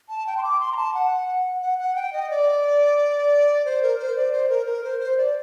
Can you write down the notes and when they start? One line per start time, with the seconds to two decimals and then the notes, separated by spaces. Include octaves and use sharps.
0.09 A5
0.27 G5
0.37 C6
0.43 D6
0.60 C6
0.72 A#5
0.77 A5
0.94 F#5
1.62 F#5
1.79 F#5
1.96 G5
2.13 D#5
2.30 D5
3.65 C5
3.82 A#4
3.99 C5
4.16 D5
4.32 C5
4.49 A#4
4.67 A#4
4.84 C5
5.00 C5
5.17 D5